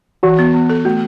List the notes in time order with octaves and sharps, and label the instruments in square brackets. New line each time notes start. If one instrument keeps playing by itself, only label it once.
[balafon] E3 [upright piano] F#4
[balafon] B3
B3
A4
[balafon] A3 [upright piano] F#4